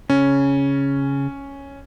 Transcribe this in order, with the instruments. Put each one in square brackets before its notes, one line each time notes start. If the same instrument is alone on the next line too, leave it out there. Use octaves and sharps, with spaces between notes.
[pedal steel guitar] C#3 [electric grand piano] C#4